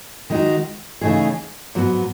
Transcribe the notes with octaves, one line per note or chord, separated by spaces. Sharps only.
D#3 G#3 D#4 F#4
C#3 E3 A3 D#4 G#4
G#2 F#3 B3